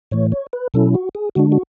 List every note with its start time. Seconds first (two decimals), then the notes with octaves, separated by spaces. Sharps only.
0.11 A2 E3 A3 C#5
0.32 C#5
0.53 B4
0.74 B2 F#3 C#4 E4 A4
0.94 F#4
1.15 G#4
1.35 D3 G#3 D4 F#4
1.52 F#4